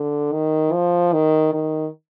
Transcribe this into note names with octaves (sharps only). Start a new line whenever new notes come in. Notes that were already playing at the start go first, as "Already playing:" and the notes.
Already playing: D3
D#3
F3
D#3
D#3